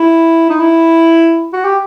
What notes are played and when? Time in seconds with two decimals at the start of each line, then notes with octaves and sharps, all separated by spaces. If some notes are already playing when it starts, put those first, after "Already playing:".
Already playing: E4
0.50 D#4
0.60 E4
1.53 F#4
1.65 G4